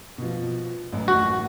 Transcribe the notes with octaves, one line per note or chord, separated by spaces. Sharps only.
B2 F3
A1 F#2
D#2 A2 E3 F#4